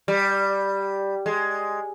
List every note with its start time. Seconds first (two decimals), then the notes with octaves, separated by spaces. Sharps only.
0.08 G3
1.26 G#3